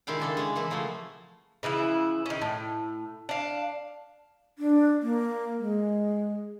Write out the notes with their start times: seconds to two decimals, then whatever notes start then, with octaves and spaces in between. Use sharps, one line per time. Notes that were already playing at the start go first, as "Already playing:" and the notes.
0.07 C3 D#3 G#3 E4 F5 G5
0.20 C#3 D4 A4
0.37 G#3 C#4
0.56 E3 A#3 E4
0.70 C#3 F3 F#3 A3
1.63 C#3 E3 F3 E4
2.26 D#3 C#4
2.42 A2
3.29 D4 F5
4.59 D4
5.02 A#3
5.59 G#3